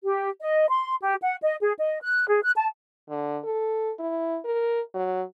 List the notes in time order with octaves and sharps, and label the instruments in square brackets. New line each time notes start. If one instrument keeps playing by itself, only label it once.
[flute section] G4
D#5
C6
G4
F#5
D#5
G#4
D#5
F#6
G#4
F#6
A5
[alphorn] D3
A4
E4
A#4
F#3